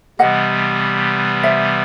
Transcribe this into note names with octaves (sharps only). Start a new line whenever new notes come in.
C3 E3 G3 B3 D#5 F#5
C5 E5